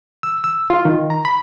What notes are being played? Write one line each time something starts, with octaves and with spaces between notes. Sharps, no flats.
E6
E6
F4
D#3
A#5
B5